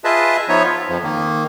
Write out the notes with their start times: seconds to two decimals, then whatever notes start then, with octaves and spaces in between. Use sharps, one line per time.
0.04 F4 G#4 B4 D#5 E5 A5
0.49 F3 B3 D#4 C#5 E5
0.65 F4
0.89 F2 F3
1.03 D#3 A#3